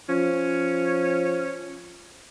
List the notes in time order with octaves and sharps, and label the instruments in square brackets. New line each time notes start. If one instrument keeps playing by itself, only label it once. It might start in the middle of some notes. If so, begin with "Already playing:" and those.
[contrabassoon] F3 [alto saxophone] C#4